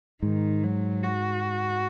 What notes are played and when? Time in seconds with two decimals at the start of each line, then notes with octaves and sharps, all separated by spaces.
0.22 G#2 D#3
0.63 F#3
1.03 F#4